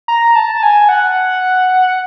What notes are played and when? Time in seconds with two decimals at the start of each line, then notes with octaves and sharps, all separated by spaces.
0.08 A#5
0.35 A5
0.63 G#5
0.89 F#5